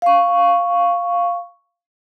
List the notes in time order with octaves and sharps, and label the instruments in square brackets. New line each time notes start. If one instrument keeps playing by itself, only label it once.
[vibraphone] F5 C#6